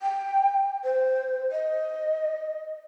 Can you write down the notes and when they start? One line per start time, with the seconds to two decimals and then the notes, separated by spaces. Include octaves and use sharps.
0.02 G5
0.84 C5
1.52 D#5